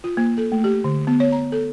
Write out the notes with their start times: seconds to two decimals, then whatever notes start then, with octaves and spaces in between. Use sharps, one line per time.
0.04 F4
0.17 A#3
0.38 A4
0.52 A3
0.64 G4
0.84 D3
1.07 B3
1.20 C#5
1.32 A#5
1.52 A4